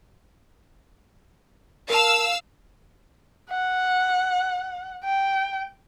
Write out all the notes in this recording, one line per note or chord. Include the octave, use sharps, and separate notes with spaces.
A#4 F5 A5 E6
F#5
G5